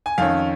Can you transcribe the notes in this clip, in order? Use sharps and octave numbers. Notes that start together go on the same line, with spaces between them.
G#5
F2 D#3 C#4 F5